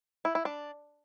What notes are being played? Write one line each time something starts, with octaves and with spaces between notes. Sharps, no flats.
E4
E4
D4